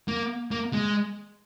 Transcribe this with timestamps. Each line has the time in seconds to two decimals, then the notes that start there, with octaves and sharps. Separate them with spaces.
0.08 A#3
0.51 A#3
0.73 G#3